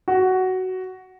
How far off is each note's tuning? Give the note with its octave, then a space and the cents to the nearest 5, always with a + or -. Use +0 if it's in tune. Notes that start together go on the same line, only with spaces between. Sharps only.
F#4 +10